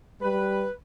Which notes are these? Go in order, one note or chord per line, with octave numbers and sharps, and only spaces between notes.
G3 B4